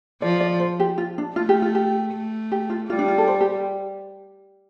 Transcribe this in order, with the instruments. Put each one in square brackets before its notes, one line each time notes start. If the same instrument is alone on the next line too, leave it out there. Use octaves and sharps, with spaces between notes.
[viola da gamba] F3 [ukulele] D5
[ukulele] D5
C5
G4
F4
D4
[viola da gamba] A3 [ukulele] F4
[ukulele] G4
F4
G4
[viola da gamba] A3
[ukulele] G4
F4
[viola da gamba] G3 [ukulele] F4
[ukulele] D4
F4
A4
C5
G4